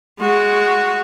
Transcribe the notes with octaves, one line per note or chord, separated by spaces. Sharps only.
G#3 F#4